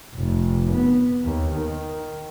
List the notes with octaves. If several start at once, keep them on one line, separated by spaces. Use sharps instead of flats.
F1
B3
D#2
D#3